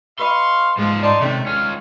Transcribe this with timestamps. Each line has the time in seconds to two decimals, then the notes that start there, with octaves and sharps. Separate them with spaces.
0.19 B4 D#5 F5 C6 C#6
0.78 G#2 F3 G#3 F4
1.03 D#4 C5 D5 A5
1.21 C3 D#3 A3 C#4
1.46 C#4 F4 C#5 F6